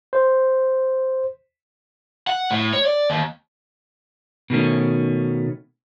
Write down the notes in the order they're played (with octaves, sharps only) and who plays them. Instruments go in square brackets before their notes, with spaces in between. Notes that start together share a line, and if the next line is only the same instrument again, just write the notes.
[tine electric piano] C5
[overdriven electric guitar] F#5
A2
C#5
D5
D#2
[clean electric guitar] B2 D#3 A3 C#4